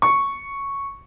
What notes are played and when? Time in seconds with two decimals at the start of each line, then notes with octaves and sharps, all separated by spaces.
0.02 C#6